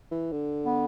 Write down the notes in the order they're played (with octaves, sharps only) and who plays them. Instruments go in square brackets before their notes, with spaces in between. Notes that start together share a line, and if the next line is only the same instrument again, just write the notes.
[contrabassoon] E3
D3
[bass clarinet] B3